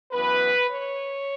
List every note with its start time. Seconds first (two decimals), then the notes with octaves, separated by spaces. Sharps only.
0.12 F#2 E3 B3 B4
0.67 C#5